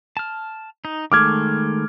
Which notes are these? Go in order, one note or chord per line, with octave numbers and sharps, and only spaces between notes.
A5 F6
D#4
D#3 G#3 A3 D6 F6 G#6